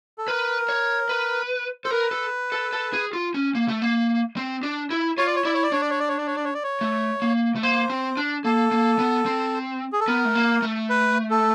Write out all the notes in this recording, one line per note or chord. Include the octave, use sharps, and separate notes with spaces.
A4
A#4 B4
C#5
B4
A4 C5
A#4 B4
A4
A4
A4
G#4
F4
C#4
A#3
A3
A#3
C4
D4
E4
F4 C#5
D5
C#5
E4 D5
C#5
D5
D4 C#5
D5
C#5
D5
C#5
D5
C#5
D5
C#5
D5
C#5
A3
A#3
A3
A#3 C5
C4
D4
A#3 A4
A#3
B3
C4
G#4
A4
B3 A#4
A3
A#3
A3
B4
A4